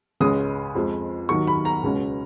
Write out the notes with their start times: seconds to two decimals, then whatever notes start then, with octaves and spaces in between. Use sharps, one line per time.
0.20 C#2 C#3 G#3 C#4 D#6
0.75 F2 F3 G#3
1.29 D#2 D#3 F#3 C#6
1.47 B5
1.65 A#5
1.83 C#2 B2 G#3 C#4